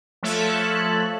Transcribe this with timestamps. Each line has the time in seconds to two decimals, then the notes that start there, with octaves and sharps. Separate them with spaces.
0.23 F3 A3 A4 C#5 E5 F#6